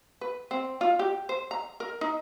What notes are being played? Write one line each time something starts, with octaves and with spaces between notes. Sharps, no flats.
B4
C4
F4
G4
C5
A#5
A#4
D#4